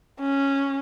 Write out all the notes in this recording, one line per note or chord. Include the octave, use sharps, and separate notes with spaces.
C#4